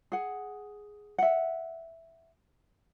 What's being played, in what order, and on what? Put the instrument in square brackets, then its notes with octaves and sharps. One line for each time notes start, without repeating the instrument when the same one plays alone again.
[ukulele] G#4 F#5
E5 F#5